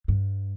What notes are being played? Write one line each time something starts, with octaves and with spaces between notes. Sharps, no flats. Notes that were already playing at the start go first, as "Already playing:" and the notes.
G2